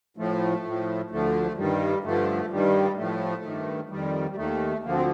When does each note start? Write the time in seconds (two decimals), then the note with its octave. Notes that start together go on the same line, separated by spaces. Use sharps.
0.17 A2 F3 A3
0.65 A2 F3
1.10 D2 D3 F3 A3
1.57 G2 D#3 G3
2.03 G2 D3 F3 A3
2.50 G2 D#3 G3
2.97 A2 F3 A3
3.44 G2 D#3
3.89 F2 D#3 G3
4.31 G3
4.36 D#2 D#3 A3
4.83 D2 D3 F3 A#3
4.94 C4